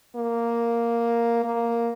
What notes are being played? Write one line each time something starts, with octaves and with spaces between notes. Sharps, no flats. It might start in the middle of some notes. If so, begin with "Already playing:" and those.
A#3
A#3